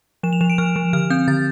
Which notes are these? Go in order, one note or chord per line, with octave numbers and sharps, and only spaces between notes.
F3 E7
F7
F3 E7
D7
F3 F6
F3
D3 F6
C4 G6
D3 A6